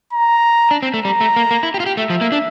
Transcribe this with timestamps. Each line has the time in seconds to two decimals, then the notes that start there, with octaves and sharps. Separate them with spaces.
0.13 A#5
0.71 D4
0.83 C4
0.94 A3
1.05 G3 A#5
1.21 A3
1.36 A#3
1.51 A#3
1.63 E4
1.74 G4
1.80 F4
1.86 G4
1.97 A3 E5
2.10 F3
2.21 A#3
2.32 D4